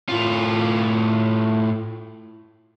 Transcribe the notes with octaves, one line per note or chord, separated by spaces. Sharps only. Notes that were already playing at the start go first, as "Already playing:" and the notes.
A2 F4